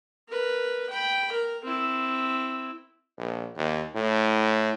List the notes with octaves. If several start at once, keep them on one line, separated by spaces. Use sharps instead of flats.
A#4 B4
G5 B5
A#4
C4 E4
A#1
D#2
A2